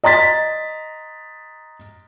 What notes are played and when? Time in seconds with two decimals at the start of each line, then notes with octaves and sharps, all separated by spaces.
0.04 D#5 A#5 C6 A6 B6